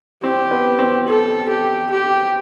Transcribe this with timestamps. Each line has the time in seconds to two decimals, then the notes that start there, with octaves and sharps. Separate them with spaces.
0.23 C4 G4
0.51 B3
0.79 C4
1.07 A4
1.49 G4
1.91 G4